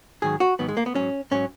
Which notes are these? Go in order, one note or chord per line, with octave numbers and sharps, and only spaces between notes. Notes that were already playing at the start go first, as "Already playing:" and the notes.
G#2 D#3 F#3 G#4
F#4
G#2 D#3 F#3 B3
G#3
A#3
B3
G#2 F#3 C#4
G#2 F#3 C#4